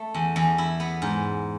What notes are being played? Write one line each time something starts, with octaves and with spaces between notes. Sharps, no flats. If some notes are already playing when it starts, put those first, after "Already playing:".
Already playing: A3 A5
E2
E2
E4
B3
G#2